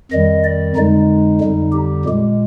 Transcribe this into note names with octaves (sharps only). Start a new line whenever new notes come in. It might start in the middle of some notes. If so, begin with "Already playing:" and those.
F2 D#3 G3 D#5
D5
F2 D3 G#3 D#4
F2 D3 G3
G4
A#2 G#3